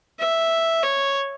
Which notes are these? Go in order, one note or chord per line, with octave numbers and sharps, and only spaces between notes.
E5
C#5